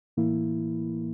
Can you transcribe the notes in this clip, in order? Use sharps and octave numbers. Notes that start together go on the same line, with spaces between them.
A2 E3 A#3 E4